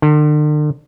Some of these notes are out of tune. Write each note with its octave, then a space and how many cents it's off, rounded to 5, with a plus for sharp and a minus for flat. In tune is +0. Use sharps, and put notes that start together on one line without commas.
D3 +40